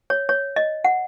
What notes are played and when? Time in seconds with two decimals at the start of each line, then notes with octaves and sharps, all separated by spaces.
0.10 C#5
0.29 C#5
0.56 D#5
0.85 F#5